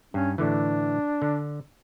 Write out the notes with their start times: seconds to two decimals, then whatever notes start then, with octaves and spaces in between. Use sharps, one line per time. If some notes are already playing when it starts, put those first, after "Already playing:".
0.14 G2 C#4
0.38 A2 D3 E3 D4
1.22 D3